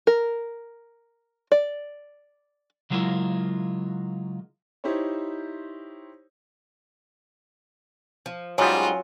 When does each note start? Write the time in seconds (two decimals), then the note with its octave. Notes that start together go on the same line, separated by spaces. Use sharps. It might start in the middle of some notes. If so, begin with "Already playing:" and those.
0.07 A#4
1.52 D5
2.90 C#3 F#3 G#3 E4 F4 A#4
4.84 D#4 E4 G4 C5 C#5
8.26 F3
8.58 G#2 F#3 G3 C#4 F4 F#4 G#4